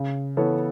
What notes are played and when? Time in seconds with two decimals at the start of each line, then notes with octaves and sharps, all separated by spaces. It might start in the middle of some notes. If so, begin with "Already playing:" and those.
Already playing: C#3
0.37 E3 B3 A4 C#5